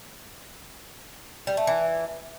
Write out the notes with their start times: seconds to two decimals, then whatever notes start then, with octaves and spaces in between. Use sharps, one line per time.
1.47 G3
1.57 A3
1.67 E3